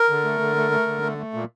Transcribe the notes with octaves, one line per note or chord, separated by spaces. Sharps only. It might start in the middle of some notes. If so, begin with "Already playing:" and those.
Already playing: A#4
D3
A3
D3
A3
A3
D3
A3
A3
A#2